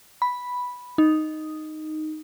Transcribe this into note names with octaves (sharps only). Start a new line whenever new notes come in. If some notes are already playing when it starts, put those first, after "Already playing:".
B5
D#4